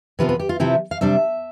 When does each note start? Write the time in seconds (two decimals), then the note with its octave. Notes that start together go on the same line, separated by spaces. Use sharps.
0.19 C3 F3 B3 F4 B4
0.29 B4
0.40 G4
0.49 F4
0.60 C3 F3 C4 E4
0.91 F5
1.01 C3 G3 D4 E5